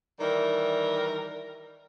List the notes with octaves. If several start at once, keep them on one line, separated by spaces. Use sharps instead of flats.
D#3 E3 G3 A#4